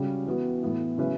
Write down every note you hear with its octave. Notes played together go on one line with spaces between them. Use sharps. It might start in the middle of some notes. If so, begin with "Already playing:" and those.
Already playing: C#3 G3 C#4 F#4
E3 B3 F#4
A2 E3 B3 E4
C#3 F#3 C#4 E4 B4